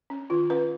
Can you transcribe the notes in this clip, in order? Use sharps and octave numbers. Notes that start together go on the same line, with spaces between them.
C#4
D#3 F4
C#4 B4